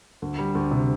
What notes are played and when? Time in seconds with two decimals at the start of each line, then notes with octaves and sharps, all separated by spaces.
0.22 D2
0.38 G3
0.55 D2
0.71 C3